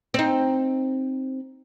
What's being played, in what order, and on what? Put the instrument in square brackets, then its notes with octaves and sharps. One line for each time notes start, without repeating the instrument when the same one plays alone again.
[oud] C4 D#4